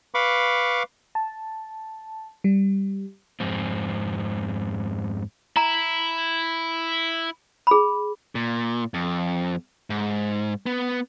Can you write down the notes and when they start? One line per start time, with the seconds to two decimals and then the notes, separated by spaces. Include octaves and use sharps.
0.14 B4 F5 B5 C#6 D6
1.15 A5
2.44 G3
3.40 F2 G#2 C4
5.56 E4 A#5
7.67 G#4 B5
8.35 A#2
8.94 F2
9.90 G#2
10.66 B3